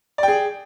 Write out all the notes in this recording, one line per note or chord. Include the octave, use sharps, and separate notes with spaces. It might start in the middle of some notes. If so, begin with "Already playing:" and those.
G#4 D5 G5